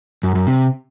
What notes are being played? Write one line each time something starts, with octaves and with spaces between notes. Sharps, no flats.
F#2
F#2
C3